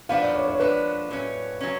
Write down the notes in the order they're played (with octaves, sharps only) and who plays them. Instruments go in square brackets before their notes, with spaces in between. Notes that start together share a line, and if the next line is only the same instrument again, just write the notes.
[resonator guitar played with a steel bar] F3 B3 D4 [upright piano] F5
[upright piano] D5
C#5
C#5
[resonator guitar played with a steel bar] F3 B3 D4 [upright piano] B4
[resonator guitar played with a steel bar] A2 F#3 C#4
F#3 C#4